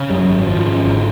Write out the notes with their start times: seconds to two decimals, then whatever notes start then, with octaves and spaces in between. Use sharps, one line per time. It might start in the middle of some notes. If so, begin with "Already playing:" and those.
Already playing: C#3
0.10 F#2 G3
0.19 F#3
0.29 G#1
0.42 F#3
0.47 G#1 F3
0.65 C#3
0.84 G#1
0.96 D3